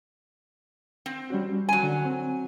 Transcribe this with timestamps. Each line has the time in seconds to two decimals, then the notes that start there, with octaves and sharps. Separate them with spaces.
1.06 C4
1.30 G3 C#4 F#4
1.69 F#3 G#5
1.83 D3
2.05 C4